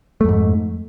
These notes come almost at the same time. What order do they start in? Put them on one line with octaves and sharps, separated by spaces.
A3 F2 G#2